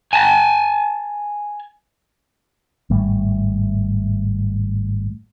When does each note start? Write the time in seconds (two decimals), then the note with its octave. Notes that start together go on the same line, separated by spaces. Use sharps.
0.13 G#5 A5
2.90 G#1 A2 G3 A3